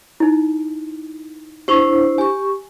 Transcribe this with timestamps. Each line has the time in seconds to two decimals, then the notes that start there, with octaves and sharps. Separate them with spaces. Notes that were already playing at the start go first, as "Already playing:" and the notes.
0.20 D#4 E4
1.68 D4 E4 G4 C5 C#6
2.18 G4 G#5 C#6